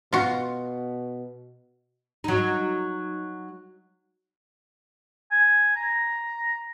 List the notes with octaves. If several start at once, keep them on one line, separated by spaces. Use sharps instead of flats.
B2 F4 F#4
F#3 D#4
G#5
A#5